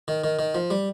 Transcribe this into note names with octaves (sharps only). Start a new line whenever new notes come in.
D#3
D#3
D#3
F3
G3